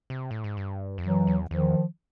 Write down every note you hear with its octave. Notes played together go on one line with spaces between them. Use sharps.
C3
A2
G#2
G2
F2
F#2 E3 F#3
E2
E2 D#3 F3